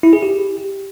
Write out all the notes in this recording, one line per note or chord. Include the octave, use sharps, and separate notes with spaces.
E4
G#4
G4